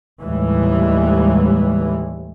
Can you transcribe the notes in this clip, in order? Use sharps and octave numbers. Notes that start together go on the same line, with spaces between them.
D#2 A2 E3 G3 G#3